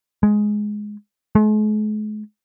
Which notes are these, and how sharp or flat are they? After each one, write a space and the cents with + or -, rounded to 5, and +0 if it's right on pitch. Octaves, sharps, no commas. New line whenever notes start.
G#3 +10
G#3 +45